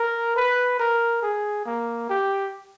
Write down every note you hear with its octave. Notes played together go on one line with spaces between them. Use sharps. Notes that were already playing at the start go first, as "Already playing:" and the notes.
Already playing: A#4
B4
A#4
G#4
A#3
G4